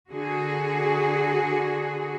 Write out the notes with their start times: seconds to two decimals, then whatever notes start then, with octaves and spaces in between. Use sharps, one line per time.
0.10 D3 F#4 G#4